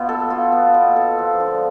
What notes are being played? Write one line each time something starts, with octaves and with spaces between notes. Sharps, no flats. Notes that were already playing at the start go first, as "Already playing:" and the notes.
Already playing: B2 B3 F4
A4
F4
B3
B2
A4
F3
D3